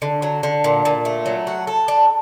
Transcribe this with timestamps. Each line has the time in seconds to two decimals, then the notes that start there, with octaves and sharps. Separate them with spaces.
0.02 D3
0.22 F#3
0.43 D3
0.64 A#2
0.85 A#2
1.05 A3
1.26 F#3
1.47 F#4
1.67 A4
1.88 D4